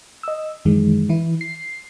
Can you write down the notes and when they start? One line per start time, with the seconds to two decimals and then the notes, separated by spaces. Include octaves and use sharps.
0.23 D#5 E6
0.65 F#2 D#3 E3 G#3
1.09 E3 E4
1.41 C7